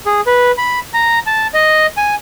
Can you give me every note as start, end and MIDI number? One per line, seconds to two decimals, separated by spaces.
0.06 0.21 68
0.27 0.52 71
0.58 0.79 83
0.94 1.19 82
1.27 1.47 81
1.54 1.86 75
1.97 2.15 80